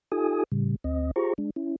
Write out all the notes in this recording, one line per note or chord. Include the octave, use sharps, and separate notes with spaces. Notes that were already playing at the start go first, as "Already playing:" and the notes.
D#4 F4 G4 A4 G#5 D#6
A2 C#3 G3
D2 C4 D#5
F4 G4 G#4 C5 A#5 C#6
G#3 D4
C#4 E4